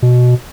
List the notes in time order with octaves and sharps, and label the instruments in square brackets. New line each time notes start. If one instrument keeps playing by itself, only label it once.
[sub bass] B2